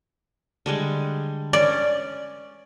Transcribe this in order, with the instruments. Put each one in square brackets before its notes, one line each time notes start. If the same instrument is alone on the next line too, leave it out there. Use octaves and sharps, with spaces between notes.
[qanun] D3 G3 G#3
[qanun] C#4 [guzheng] D5